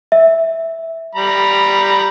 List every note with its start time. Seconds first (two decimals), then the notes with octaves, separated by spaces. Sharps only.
0.12 E5
1.15 G3 A#5 B5